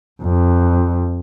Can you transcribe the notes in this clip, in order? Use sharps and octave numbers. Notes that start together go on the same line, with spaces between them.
F2